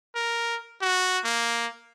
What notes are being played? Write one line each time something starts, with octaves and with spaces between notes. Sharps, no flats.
A#4
F#4
A#3